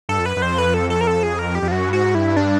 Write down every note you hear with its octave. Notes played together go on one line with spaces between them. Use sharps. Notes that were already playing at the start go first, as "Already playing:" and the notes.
G2 A4
F2
F#2 B4
F#2
F2 C5
B4
A4
A4
A#4
A4
G#4
A#4
G4
F2
F4
F#2 F#4
G2
G#2 F#4
G2 E4
D4